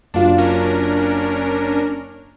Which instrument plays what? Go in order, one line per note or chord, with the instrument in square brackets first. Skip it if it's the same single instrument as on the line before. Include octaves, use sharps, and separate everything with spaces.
[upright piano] F#1 F4 [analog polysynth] D4
[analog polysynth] C#4 D4 A#4